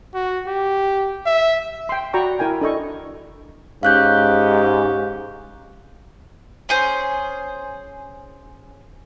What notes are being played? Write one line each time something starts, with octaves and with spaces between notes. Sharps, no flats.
F#4
G4
E5
G5 C6
F#4 D5 G5 A#5 B5 C#6
E4 A#4 G5 G#5
D4 A4 D#5 C#6
G#2 C#4 G4 F5 F#6 G6
C#4 G#4 C5